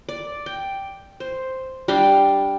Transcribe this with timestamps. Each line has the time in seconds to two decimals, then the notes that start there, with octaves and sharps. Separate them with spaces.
0.09 D5
0.46 G5
1.20 C5
1.88 G3 D4 F5 G5